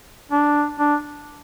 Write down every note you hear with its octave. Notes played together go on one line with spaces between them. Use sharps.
D4
D4